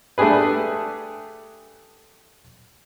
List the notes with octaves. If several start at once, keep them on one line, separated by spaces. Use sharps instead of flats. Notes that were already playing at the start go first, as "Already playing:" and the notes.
A3 D4 G4 G#4 B4